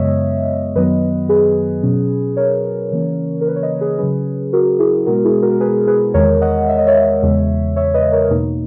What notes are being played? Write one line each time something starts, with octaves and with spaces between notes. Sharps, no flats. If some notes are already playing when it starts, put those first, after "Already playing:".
Already playing: F#2 C#3 G#3 B3 C#5 D#5 E5
F#2 D#3 F#3 B3 B4 D#5
G#4 B4
B2 F#3 C#4
A#4 C#5
C#3 E3 A#3 C#4
A#4
B4
C#5
B4 D#5
G#4 B4
C#3 F#3 C#4 G#4 B4
F#4 A#4
E4 G#4
B2 G#3 B3 F#4 A#4
E4 G#4
F#4 A#4
G#4 B4
G#4 B4
E2 D#3 G#3 A#4 C#5
D#5 F#5
E5
D#5
C#5 E5
E2 C#3 G#3
C#5 E5
B4 D#5
A#4 C#5
E2 B2 A#3 D#4